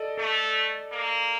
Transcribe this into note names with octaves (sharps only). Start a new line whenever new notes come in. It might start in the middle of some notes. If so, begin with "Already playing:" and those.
Already playing: A4 D5 D#5
A3 A4
A#3